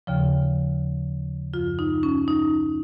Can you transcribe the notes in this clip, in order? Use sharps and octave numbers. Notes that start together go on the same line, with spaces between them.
D#2 C#3 F3
F#2 F3 F4
D#4
C#4
D#4